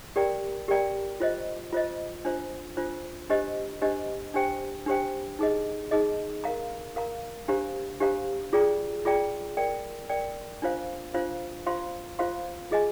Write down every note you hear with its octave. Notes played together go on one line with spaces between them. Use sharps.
G4 A#4 D5 G5 A#5
G4 A#4 D5 G5 A#5
F4 C5 D#5
F4 C5 D#5
D4 F4 C5
D4 F4 C5
D4 G4 C5 D#5
D4 G4 C5 D#5
D4 G4 C5 G5
D4 G4 C5 G5
D#4 G#4 D#5
D#4 G#4 D#5
A#4 F5 A#5
A#4 F5 A#5
D4 G4 C5 F5 A#5
D4 G4 C5 F5 A#5
F4 G#4 D5 G5 A#5
F4 G#4 D5 G5 A#5
A#4 D5 G5
A#4 D5 G5
D4 F4 C5 F5
D4 F4 C5 F5
F4 C5 F5 C6
F4 C5 F5 C6
F4 G#4 D#5 G#5